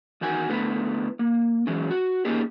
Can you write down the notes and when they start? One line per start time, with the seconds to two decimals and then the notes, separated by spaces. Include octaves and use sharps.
0.21 E2 D#3 F#4 G#5
0.49 D3 A3 B3 E4 B4
1.19 A#3
1.67 E3 F#3 G#3 C#4
1.91 F#4
2.25 A#3 C#4 D#4 G4 G#4